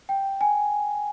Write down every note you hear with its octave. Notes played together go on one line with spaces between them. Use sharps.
G5
G#5